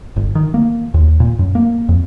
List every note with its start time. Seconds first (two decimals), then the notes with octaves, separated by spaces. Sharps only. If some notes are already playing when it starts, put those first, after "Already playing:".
0.16 G1
0.35 D#3
0.54 A#3
0.94 D#2
1.20 A#2
1.39 F#2
1.55 A#3
1.89 F2